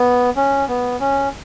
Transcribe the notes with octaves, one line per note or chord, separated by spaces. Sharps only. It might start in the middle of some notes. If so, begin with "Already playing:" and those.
Already playing: B3
C#4
B3
C#4